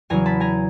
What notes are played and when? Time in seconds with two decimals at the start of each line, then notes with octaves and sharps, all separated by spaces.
0.10 E2 C#3 F#3 G#5 A#5
0.26 A5 B5
0.40 G#5 A#5